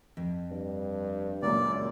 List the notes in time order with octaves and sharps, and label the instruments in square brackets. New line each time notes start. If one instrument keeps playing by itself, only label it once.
[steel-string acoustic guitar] F2
[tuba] G2
[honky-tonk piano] C#2 F#2 A#2 [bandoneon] D5